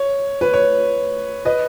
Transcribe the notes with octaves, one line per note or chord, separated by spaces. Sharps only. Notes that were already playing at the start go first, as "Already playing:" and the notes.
Already playing: C#5
B4
C#5
B4 D#5